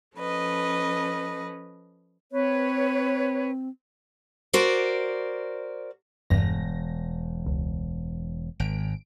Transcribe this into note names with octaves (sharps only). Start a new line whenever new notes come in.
F3 C#4 A4 B4 D#5
C4 B4 C#5
F#4 A#4 C5 D5
E1 E2 G2 A#6
C#2
G#1 D7